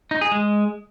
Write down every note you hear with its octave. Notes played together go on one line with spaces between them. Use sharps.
D#4
G#4
G#3